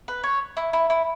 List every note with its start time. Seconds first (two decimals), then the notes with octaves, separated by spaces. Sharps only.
0.08 B4
0.24 C#5
0.57 E4
0.73 E4
0.90 E4